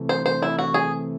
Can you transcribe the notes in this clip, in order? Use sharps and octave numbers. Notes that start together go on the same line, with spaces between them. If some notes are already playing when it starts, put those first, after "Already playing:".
Already playing: C3 E3 A3
C5
C5
E4
F#4
G#4